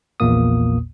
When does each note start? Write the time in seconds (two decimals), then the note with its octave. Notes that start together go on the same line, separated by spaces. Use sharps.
0.20 A#1 E2 A#2 A#3 D#6